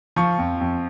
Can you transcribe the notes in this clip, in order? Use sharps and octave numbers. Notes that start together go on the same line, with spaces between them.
F3 C#6
F2
F2